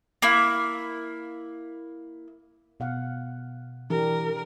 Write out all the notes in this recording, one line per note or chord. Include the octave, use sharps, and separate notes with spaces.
A#3 E4
B2 F5 F#5
E3 D4 G4 A#4